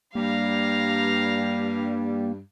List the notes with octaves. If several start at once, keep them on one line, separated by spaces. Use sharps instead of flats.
G2 G3 A#3 F5 A#5